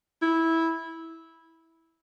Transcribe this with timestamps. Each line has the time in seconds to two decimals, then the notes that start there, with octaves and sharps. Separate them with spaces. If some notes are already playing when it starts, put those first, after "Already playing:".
0.22 E4